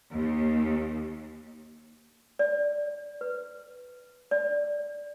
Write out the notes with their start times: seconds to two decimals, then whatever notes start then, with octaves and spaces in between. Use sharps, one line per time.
0.13 D#2
2.39 D5
3.21 B4
4.31 D5